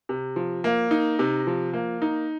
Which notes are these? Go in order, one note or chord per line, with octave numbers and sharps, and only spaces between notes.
C3
F3
A#3
D#4
C3
F3
A#3
D#4